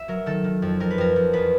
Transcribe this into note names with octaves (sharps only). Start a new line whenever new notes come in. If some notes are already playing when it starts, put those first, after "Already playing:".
Already playing: E5
F#3 A#4
D#3 A4
D#3
F2
F2 A#4
B4
F2 A#4
F2
E2 B4